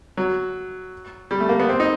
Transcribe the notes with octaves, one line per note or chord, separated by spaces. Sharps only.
F#3
G3
A3
A#3
B3
C4
D#4